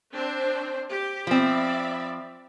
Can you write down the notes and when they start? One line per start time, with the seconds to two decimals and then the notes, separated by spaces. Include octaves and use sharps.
0.12 C4 D4 C5
0.89 G4
1.27 F3 C4 D5 E5 B5